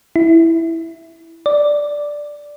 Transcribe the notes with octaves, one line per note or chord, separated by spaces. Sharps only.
E4
D5